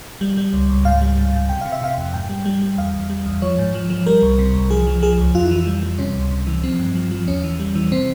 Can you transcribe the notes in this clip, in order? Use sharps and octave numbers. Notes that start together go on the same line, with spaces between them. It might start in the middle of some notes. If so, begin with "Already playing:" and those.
G3
G3
C#2
C#2
G#2 F5
G3
G#2
G#2
C3 G5
C3 F5
E5
C3 F5
F2
G#2 G5
G3
G3
G3
E2 F5
E2
G3
E2
F3 C#5
G#2
F3
F3
G3 A#4
C2
C3
C2
F3 G#4
F3
F3 G#4
C#2
F2 F4
E4
E3 F4
G3
G3
C3 C#4
C#2
C3
E3
F3 C4
G2
F3
F3
E2 C#4
E3
G3
E3
C3 C4